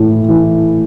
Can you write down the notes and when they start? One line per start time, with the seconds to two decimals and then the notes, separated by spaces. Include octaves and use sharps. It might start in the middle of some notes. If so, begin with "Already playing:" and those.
Already playing: A2 E3
0.29 E3